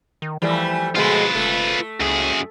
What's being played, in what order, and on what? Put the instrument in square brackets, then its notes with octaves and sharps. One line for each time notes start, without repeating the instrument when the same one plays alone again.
[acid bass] D#3
[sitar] E3 G3 A3 [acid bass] F3
[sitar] B2 G#3 A3 [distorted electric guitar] F4 B4
[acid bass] F1 [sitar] A3
[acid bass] C#2 [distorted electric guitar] F#2 G#4